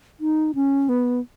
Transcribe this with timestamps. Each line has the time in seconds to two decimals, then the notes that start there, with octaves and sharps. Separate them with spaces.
0.20 D#4
0.55 C#4
0.89 B3